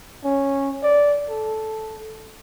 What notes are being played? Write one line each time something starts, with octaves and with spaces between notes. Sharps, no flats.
C#4
D5
A4